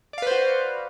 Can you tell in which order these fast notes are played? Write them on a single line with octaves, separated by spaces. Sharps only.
D5 F5 B4 C5 F#4